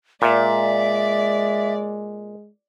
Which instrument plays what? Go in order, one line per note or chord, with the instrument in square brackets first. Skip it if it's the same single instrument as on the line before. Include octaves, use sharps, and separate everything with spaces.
[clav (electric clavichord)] A#2 [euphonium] G#3 [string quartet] D5 [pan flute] E5